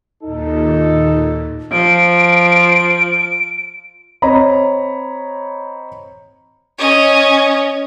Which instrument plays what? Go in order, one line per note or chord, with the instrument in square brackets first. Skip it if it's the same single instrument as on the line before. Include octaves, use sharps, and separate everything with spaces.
[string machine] D#2 A#2 [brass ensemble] D#4 A4
[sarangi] F3 [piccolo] D7
[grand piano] C4 C#5 D#5 A#5 B5
[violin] C#4 D#5